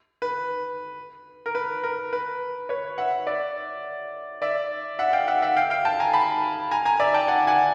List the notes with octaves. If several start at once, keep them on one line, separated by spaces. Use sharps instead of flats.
B4
A#4
B4
A#4
B4
B4 C#5
E5 F#5
D5 E5
D5 E5
E5 F#5
F5 G5
E5 F#5
E5 F#5
F5 G5
F5 G5
G5 A5
G#5 A#5
A5 B5
G#5 A#5
G#5 A#5
D5 E5
G5 A5
F#5 G#5
F#5 G#5